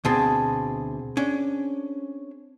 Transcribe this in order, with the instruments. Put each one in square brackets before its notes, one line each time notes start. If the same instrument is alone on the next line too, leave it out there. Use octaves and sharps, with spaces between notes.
[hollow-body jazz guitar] D2 B2 C6 [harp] C4 G#4 A5
[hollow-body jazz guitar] C#4 D4